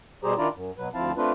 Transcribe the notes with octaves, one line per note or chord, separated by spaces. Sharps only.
B2 G3 G4 G#4 C5 A#5
D#3 D4 E4 F4 D5 A#5
F#2
B2 F#3 B4
D2 F3 C4 E4 F5 A5
A3 C4 D4 F4 B4